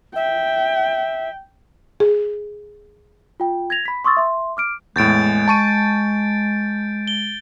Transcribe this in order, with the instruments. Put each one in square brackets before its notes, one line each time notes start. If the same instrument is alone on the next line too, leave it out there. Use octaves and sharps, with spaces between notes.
[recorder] E5 [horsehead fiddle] G5
[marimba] G#4
[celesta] F4 G5
G#6 A#6 F7
B5 B6
C6 C#6 D#6 E6 A6
E5 C6
D6 F6 D7
[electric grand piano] E2 A2 [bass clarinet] G#3 [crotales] G6 A6 D7
[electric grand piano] A5 C#6 D#7
[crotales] G7